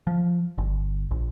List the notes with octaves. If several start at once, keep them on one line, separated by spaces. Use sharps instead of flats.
F3
G1
A#1